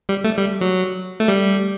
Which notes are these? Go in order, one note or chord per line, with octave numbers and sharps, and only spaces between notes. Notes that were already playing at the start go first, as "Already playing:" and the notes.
G3
A3
G3
F#3
A3
G3